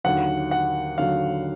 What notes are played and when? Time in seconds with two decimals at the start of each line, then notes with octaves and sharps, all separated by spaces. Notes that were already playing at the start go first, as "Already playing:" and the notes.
0.04 D#2 D3 F#3 F#5
0.51 F#5
0.98 D#2 D3 F#3 F5